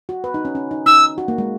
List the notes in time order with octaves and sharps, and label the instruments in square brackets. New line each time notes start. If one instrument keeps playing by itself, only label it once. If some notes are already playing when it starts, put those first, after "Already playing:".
[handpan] F#4
B4
D#4
C#4
C#4
D#4
[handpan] D#4 [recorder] E6
[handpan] F#4
A#3
G#3